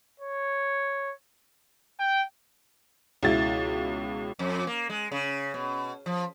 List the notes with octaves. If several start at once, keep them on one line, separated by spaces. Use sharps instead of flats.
C#5
G5
C#2 B2 E4 A6
F2
A#3
G#3
C#3
B2
F3